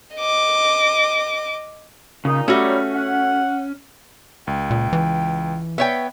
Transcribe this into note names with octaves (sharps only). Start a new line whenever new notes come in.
D#5 D6
A#2 C#3 D#4
F#3 G3 A3 C#4 F#4
F#5
C#2 G5
A#2
E3
B3 C#5 E5 G5